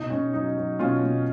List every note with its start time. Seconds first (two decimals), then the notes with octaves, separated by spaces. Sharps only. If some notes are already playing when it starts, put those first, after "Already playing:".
Already playing: B2 D#4
0.10 B2 C#4
0.33 F#3 D#4
0.57 F#3
0.79 B2 C#4 F4
1.03 B2